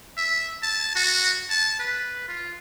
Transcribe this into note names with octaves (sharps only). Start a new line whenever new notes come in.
E5
A5
F#4
A5
B4
F4